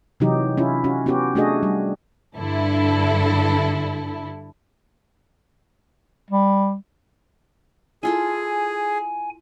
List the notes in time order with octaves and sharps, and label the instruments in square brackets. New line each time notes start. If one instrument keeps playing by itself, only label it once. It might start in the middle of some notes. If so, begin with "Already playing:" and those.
[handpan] C3 E3 F#3 D#4 G4
C#4 E4 F4
C#4 F#4
B3 C#4 F#4 G4
A3 D4 F#4 G#4 D#5
G3
[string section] G2 D3 E4 A4
[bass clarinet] G3
[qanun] E4 F4 A4 [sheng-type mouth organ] G#4 [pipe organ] G#5